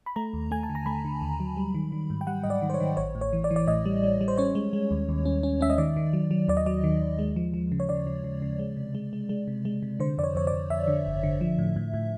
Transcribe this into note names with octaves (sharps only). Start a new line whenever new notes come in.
B5
A3 A#5
D#2
A3 G#5
A5
D3
A#5
A3 B5
D3
D#2
F#3
G3
D#3
D#3
G#2
G5
G3 F#5
G#2 D#5
D5
D#3
C5
C#5
D#3
A1 C#5
A2
C#5
E3
D5
E3
D5
A2 D#5
G3
G3
G3
C5
C#4 C#5
G#3
G#3
D#2
D#2
C#4
C#4
C#4 E5
D#5
D#3 D5
D#3
F#3
F#3
D#2 D5
D#5
F#3 D5
D#3
D#2
G#3
F3
F3
C#3
C#5
C#3 D5
C#3
C#3
C#3
G#3
C3
G#3
G#3
G#3
C3
G#3
C3
D3 C5
F2 D5
C#5
F2 C#5
D5
F2
F2 E5
D3
G1
D3
F3
A2
A2
A2